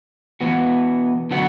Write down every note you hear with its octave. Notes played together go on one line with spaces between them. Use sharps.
E3 B3 F#4
D3 F#3 B3 F#4